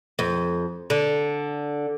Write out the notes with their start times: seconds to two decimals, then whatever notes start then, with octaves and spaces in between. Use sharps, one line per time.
0.19 F2
0.90 D3